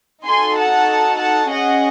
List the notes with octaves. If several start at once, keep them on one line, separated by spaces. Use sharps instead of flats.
D#4 F#4 A4 G#5 C6
F#5 A5
F#5 A5
C#4 G#4 D#5 F#5